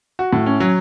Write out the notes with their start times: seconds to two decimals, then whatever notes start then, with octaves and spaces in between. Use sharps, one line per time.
0.19 F#4
0.33 A2
0.46 C#4
0.60 F#3